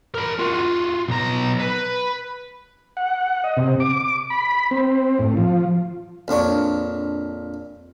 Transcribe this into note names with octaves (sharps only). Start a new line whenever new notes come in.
A#4 B5
F4 F#4
B1 A#5
B4
F#5
D#5
C3
D6
B5
C4
A2
F3
A#1 F2 D4 C#5